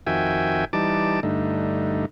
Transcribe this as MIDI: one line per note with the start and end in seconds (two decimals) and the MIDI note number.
0.07 0.65 41
0.07 0.65 51
0.07 0.65 66
0.07 0.65 76
0.07 0.65 79
0.07 0.65 80
0.73 1.20 52
0.73 1.20 55
0.73 1.20 63
0.73 1.20 81
0.73 1.20 86
1.23 2.05 43
1.23 2.05 50
1.23 2.05 57
1.23 2.05 63